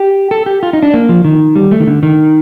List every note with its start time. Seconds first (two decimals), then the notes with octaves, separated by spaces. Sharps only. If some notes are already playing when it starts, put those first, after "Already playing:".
Already playing: G4
0.31 A4
0.46 G4
0.63 F4
0.73 D#4
0.83 D4
0.94 A#3
1.09 F3
1.25 D#3
1.56 G3
1.71 A3
1.80 D#3
1.87 D3
2.03 D#3